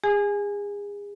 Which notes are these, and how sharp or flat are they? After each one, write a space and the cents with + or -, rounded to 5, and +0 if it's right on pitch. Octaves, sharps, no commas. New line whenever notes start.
G#4 -35 G#5 +0